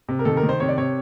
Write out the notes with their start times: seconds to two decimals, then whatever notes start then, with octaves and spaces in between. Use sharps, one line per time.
0.09 C3
0.19 A#4
0.25 D#3 A4
0.37 A#4
0.43 D#3
0.49 C5
0.60 C3 C#5
0.69 D5
0.77 C3 C#5